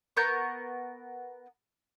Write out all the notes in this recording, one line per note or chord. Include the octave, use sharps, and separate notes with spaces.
B3 A#4 C#6 G6